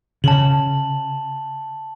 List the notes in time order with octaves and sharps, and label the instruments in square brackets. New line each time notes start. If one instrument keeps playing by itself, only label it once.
[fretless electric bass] C#3 [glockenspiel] A5 F#7